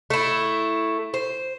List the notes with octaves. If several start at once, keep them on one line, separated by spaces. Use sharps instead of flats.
A3 E4
C5